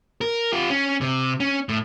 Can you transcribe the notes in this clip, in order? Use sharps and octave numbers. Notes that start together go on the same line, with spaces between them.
A#4
F4 G4
C#4
C3
C#4
A2